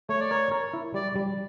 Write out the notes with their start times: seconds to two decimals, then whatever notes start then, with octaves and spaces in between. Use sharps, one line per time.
0.09 A3 C#5
0.20 D5
0.30 A#4 C#5
0.51 A#4
0.73 E4
0.94 G3 D5
1.16 G3